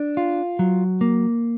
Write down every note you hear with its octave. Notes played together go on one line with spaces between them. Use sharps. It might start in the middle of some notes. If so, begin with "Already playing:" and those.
Already playing: D4
F4
F#3
A#3